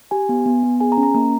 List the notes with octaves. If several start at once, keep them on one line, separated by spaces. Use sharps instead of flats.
G4 G#5
B3
B3
B3
G#4 G#5
A#5
C#4
A#5
A#3 A#5